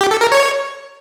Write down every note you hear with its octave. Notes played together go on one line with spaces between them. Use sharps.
G4
A4
A#4
C#5